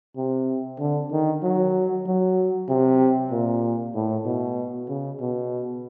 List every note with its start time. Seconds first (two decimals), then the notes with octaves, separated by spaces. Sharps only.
0.17 C3
0.80 D3
1.12 D#3
1.43 F#3
2.06 F#3
2.69 C3
3.31 A#2
3.95 A2
4.26 B2
4.89 C#3
5.21 B2